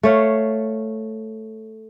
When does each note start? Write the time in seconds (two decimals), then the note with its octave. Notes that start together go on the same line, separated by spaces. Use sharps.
0.03 A3 C#5 F5